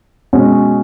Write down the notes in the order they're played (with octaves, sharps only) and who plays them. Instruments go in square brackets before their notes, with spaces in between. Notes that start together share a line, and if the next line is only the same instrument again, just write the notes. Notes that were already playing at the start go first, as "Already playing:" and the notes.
[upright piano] B2 G#3 C#4 F#4